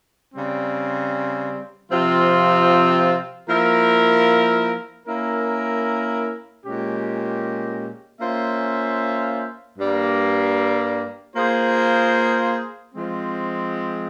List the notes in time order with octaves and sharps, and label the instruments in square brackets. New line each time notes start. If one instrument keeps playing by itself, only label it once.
[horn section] C#3 G3 C4
C3 F3 C4 F4
F3 A#3 E4 A#4
A#3 C#4 E4 A#4
A#2 G#3 C#4 G4
A#3 C#4 F4 C5 E5
G2 G3 A#3
A#3 F4 G#4 C5
F3 G#3 C4